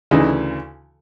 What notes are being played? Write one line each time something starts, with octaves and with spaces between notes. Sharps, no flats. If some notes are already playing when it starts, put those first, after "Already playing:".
D2 C#3 E3 D#4